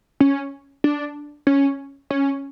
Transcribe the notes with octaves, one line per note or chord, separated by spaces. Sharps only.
C#4
D4
C#4
C#4